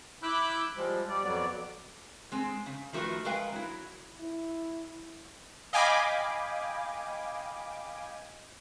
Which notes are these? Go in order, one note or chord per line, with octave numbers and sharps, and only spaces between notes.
E4 B5 D6 E6 F#6 G6
F3 G3 G#3
G3 D5
F2 F#3 B3 D5
G#3 C4
C#3
D#3 F3 A3 F#4 A#4 B4
G#3 A#4 B4 F5 G5
F#3 E4
E4
D#5 F5 G5 G#5 B5 D6